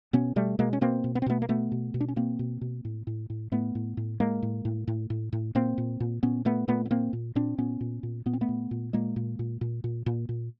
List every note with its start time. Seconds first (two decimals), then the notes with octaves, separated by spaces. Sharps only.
0.13 B2 B3 C#4
0.36 B2 G3 A3
0.59 B2 G#3 A#3
0.73 C#4
0.81 B2 A#3 C4
1.04 B2
1.15 B3
1.22 C4
1.26 B2 A3 B3
1.42 A#3
1.49 B2 A3 B3
1.72 B2
1.94 B2
2.01 D4
2.08 C#4
2.16 B2 A#3 C4
2.39 B2
2.61 B2
2.85 A2
3.07 A2
3.30 A2
3.52 A2 A3 B3
3.75 A2
3.97 A2
4.20 A2 G#3 A#3
4.42 A2
4.65 A2
4.87 A2
5.10 A2
5.33 A2
5.55 A#2 A#3 C4
5.78 A#2
6.00 A#2
6.23 A#2 B3 C#4
6.45 A#2 A3 B3
6.68 A#2 A3 B3
6.85 B3
6.90 A#2 A#3 C4
7.13 A#2
7.35 A#2 C4 D4
7.58 A#2 B3 C#4
7.81 A#2
8.03 A#2
8.26 A#2 B3
8.33 C4
8.41 A3 B3
8.49 A#2
8.71 A#2
8.93 A#2 G#3 A#3
9.16 A#2
9.39 A#2
9.61 A#2
9.84 A#2
10.06 A#2
10.29 A#2